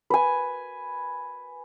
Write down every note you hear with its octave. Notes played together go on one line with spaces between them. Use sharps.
B4 G#5